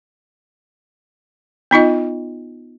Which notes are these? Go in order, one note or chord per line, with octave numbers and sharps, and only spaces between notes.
B3 D#4 F4 D#5